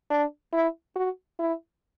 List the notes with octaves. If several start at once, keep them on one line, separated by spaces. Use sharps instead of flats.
D4
E4
F#4
E4